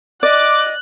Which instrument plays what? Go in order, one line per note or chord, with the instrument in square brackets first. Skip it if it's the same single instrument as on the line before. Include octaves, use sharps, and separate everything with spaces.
[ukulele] D5 [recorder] D#5 [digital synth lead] D6 [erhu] F#6